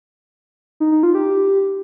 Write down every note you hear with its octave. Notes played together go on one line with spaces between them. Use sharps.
D#4
D#4
F4
G4